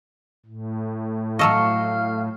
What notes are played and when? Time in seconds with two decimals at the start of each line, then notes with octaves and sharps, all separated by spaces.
0.46 A2
1.39 F#3 A4 D#5 F5 C#6